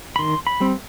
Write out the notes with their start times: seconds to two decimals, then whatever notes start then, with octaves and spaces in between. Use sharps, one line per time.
0.16 B5
0.19 D#3 C6
0.47 B5
0.60 G3 C4